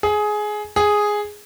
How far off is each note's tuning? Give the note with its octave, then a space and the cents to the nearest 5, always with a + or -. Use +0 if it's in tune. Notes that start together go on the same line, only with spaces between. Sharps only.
G#4 +15
G#4 +0